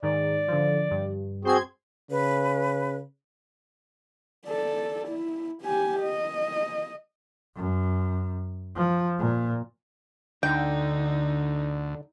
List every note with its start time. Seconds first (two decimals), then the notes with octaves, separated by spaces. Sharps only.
0.02 G#2 D#3 D5
0.48 D3 F3
0.91 G2
1.45 C4 F#4 G#4 C5 C6 G#6
2.11 C#3 B4
4.47 A4 D5
5.08 E4
5.62 G4 G#5
6.01 D#5
7.56 F#2
8.76 F3
9.19 A#2
10.43 D2 D3 D#4 G5